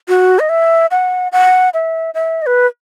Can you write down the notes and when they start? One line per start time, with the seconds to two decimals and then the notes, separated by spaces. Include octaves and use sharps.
0.08 F#4
0.39 D#5
0.49 E5
0.91 F#5
1.32 F#5
1.74 E5
2.14 E5
2.42 D#5
2.46 B4